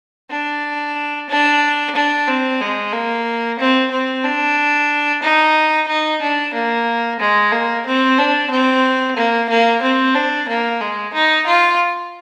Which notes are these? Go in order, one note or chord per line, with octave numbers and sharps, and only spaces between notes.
D4
D4
D4
C4
G#3
A#3
C4
C4
D4
D#4
D#4
D4
A#3
G#3
A#3
C4
D4
C4
A#3
A#3
C4
D4
A#3
G#3
D#4
F4